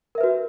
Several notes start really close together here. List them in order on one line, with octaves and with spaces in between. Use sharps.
A#4 E5 B4 F#4